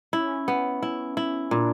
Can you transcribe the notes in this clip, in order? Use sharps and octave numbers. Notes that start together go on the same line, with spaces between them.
C#4 E4
B3
E4
E4
A#2 D4